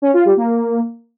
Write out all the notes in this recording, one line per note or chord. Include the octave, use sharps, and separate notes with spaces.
C#4
F4
G3
A#3